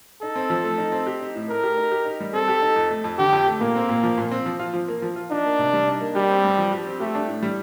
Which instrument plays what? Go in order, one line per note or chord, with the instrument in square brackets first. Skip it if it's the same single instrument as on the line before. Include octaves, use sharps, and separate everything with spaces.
[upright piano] D#4 [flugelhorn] A4
[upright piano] C4
F3
A3
D#4
C4
G4
D#4
A2
[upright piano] A3 [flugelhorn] A#4
[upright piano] G4
D#4
G4
D#4
G3
[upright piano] C4 [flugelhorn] A4
[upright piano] G4
D#4
F2
A3
F2
[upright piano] D3 [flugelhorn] G4
[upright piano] F2
A3
[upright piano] A#2 [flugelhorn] A#3
[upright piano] C4
A#2
F3
A#2
C4
F3
F4
F3
A#3
F3
F4
[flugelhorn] D4 [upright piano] D#4
[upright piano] A#3
C3
G3
D#4
A#3
[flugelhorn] G3 [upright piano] G4
[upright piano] C4
G2
F3
G4
C4
[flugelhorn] A3 [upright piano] G4
[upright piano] D4
A2
G3